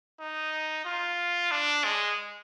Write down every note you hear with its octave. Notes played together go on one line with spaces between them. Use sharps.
D#4
F4
D4
G#3